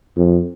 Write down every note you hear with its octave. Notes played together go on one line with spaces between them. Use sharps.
F2